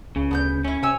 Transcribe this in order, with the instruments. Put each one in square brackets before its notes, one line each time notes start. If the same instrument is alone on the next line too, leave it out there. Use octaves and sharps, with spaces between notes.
[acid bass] C#2 [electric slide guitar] C#3
[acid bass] D2 [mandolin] B3 A5 G6
[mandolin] A3 E4 [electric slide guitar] C#4
[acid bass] C3 [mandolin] C#5 G#5 E6